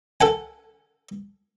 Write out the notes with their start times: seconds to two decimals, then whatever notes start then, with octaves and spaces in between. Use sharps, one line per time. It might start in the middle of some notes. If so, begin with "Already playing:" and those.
0.21 A4 F#5 G#5